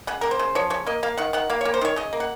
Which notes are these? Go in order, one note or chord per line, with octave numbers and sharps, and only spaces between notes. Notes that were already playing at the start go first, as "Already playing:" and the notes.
C#3 F#5
A#3 A#4
C5
C#3
F3 C#5
C#3 C#5
A#3 D#5
A#3 F5
D#3 F#5
D#3 F#5
A#3 F5
A#3 C#5
C5
D#3 C#5
C#3 D#5
A#3
F#5